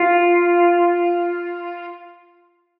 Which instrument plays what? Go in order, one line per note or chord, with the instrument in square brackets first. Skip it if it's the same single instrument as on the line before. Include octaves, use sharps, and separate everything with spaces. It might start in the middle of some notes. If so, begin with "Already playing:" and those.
Already playing: [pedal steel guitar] F4